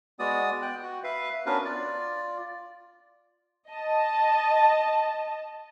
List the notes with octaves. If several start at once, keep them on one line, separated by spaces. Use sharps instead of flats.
G#3 B3 F#4 D5 D#6
G5 F#6
F#4
B4 E5 F5
B3 C#4 D4 F#4 A#4 B4
F4 D5
D#5 A5